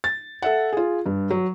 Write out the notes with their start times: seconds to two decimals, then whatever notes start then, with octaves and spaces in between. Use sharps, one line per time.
0.04 A6
0.42 A4 E5 F#5
0.73 F4 G#4
1.06 G2
1.30 F#3